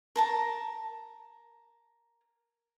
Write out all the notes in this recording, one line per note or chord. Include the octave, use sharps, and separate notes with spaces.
A#4 A5 A#5